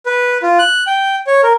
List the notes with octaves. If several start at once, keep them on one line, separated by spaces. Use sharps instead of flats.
B4
F4
F#6
G5
C#5
A#4